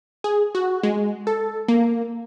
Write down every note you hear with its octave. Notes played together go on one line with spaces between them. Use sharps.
G#4
F#4
G#3
A4
A#3